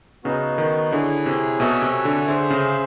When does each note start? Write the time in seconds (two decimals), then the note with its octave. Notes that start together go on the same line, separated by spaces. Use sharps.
0.24 C#3 B3 D#4 F#4
0.58 D#3
0.92 D3 E4 G#4 C#5
1.26 C3
1.60 B2 F#4 A4 C#5 E5 G#5
1.82 C3
2.05 D3
2.28 D3 G#4 C5 E5
2.50 C#3